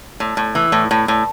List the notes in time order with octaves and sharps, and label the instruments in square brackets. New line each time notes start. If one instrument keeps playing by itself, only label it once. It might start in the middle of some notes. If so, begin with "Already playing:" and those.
[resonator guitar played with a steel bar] A2
A2
E3
A2
A2
A2